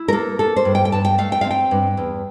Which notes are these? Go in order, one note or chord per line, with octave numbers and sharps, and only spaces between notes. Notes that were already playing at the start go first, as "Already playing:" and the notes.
Already playing: E4
A#4
A#3 A4
A#3 A4
C5
G2
G5
G5
G2 A5
G5
A3 F5
G5
C4 F5
G5
G2
E2